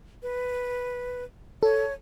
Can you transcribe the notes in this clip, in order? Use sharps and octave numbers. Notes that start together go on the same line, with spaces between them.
B4
A4 C#5